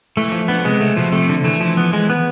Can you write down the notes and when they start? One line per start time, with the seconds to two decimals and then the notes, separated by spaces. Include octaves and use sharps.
0.17 E3 A3
0.32 F3
0.48 D3 B3
0.65 C3 G#3
0.81 C3 A3
0.97 B2 F3
1.12 C3 A3
1.29 D3
1.44 E3 A3
1.61 F3
1.77 B3
1.93 G#3
2.10 B3